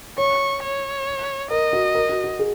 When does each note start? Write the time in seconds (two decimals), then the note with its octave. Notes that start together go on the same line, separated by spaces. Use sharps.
0.18 C#5 C#6
0.62 C#5
1.50 A#4 D#5
1.73 F#4
1.95 A#4
2.09 F#4
2.24 F#4
2.39 G#4